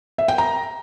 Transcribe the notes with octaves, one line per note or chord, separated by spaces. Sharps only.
E5
G5
A#5